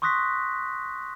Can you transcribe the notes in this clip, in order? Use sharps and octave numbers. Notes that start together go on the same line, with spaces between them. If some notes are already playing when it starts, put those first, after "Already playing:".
C6 C#6 D#6 F#6 A#6 B6